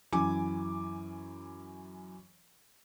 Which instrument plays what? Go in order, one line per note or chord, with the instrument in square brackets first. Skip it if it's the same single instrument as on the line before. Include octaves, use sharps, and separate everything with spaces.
[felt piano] F#2 E3 G#5 D6